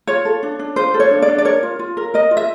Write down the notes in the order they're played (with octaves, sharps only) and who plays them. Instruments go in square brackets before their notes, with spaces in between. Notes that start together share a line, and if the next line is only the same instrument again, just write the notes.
[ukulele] F4 C#5
A4
D4
D4
F4 C5
A4
C#5
D4
D5
D4
D5
A#4 C#5
F4
F4
A#4
A#4 D#5
F4
E5